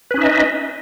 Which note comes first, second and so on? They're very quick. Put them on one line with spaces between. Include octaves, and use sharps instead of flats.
B4 C#4 D#4 E5 D#5